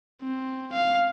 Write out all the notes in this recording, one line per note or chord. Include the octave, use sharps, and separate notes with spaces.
C4
F5